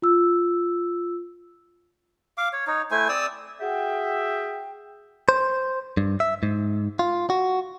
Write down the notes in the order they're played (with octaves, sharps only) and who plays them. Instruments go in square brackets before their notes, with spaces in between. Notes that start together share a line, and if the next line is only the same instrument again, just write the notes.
[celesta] F4 E6
[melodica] F5 D6
C#5
D#4 C#5
A3 E4 C5 G#5
C4 D5 D#6 E6
[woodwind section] F#4 G#4 E5 G5
[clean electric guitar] C5
G2
E5
G#2
F4
F#4